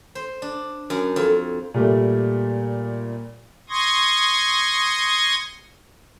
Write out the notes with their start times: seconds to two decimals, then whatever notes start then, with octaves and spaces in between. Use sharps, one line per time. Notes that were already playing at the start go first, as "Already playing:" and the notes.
0.15 C5
0.42 D4
0.90 F#2
1.16 F2
1.74 A#2 G3 A3
3.69 C6 C#6 D#6 G#6 A#6